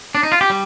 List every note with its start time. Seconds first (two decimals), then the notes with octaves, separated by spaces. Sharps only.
0.15 D4
0.23 D#4
0.32 F4
0.41 G4
0.50 G3